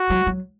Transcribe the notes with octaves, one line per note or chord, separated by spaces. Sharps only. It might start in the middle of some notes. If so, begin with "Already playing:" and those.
Already playing: F#4
F#3
F#3